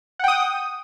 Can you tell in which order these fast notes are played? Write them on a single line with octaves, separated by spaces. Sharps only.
F#5 G5 D#6